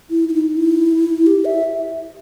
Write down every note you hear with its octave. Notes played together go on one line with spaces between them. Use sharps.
E4
E4
D#4
E4
G4
E5